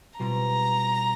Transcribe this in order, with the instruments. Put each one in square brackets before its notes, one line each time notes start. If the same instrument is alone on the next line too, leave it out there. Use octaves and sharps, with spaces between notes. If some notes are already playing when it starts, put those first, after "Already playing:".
[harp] B2 G3 C4 F4 [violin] A#5